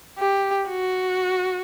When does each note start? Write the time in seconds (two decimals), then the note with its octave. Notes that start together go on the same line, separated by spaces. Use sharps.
0.18 G4
0.69 F#4